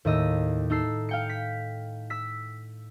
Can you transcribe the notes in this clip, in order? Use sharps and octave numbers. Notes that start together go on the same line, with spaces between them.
D#2 A2 D#5 E6
D#4 A4 E6 C7
F5 G5 C#7
B6
E6 B6